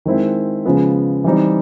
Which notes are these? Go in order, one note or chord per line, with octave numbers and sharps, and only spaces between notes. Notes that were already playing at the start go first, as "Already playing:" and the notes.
D#3 G#3 C4 E4
C#3 F3 G#3 B3
E3 G3 C4 D#4